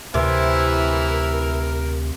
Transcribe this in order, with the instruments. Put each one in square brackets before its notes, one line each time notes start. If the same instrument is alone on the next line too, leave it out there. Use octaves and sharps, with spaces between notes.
[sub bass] D2 [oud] C3 [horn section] E3 E4 [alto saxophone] A#4